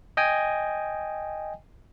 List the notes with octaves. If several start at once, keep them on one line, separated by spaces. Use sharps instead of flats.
D#5 G5 G#5